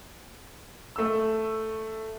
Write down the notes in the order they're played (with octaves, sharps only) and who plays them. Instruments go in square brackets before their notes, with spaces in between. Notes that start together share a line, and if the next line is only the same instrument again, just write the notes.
[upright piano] A3 E6